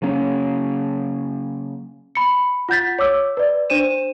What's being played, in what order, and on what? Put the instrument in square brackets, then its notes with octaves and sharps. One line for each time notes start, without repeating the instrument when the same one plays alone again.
[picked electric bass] C#3 F#3 A#3 C#4
[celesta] B5 C#7
F4 F#5 G6 A6 B6
C#5 D6 E6
B4 D5
D4 C5 D#7 E7